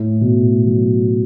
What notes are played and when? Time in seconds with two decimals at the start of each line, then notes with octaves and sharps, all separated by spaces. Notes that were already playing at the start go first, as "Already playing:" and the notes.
Already playing: A2
0.21 B2
0.67 F#3